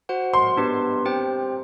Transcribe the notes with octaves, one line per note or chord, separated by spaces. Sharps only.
F#4 C5 F#5
C6
B3 D4 G4 B4
C4 G4 C5 G5